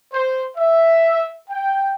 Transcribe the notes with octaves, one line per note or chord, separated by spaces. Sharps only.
C5
E5
G5